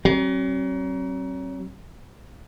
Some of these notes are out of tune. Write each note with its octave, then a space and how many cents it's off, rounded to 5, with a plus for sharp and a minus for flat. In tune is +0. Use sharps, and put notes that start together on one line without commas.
F#3 +35 C4 +45